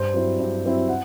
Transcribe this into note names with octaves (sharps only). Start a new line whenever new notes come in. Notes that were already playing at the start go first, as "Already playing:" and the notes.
Already playing: G2 C5
F#3 C4 E4
G2
F#3 C4 E4
F#5